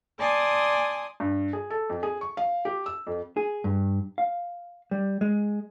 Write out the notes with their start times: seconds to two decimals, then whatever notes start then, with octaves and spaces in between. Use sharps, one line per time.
0.19 D5 G#5 A5 C6 D#6
1.20 G2
1.53 G#4
1.70 A4
1.90 F2
2.03 G#4
2.21 C#6
2.37 F5
2.65 G4
2.86 E6
3.07 F2
3.37 G#4
3.64 G2
4.18 F5
4.91 G3
5.21 G#3